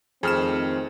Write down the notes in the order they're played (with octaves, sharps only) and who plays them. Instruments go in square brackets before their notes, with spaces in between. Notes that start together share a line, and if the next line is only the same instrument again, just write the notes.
[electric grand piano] F2 F6 E7 [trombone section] D#3 A3 C4 [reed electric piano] G#4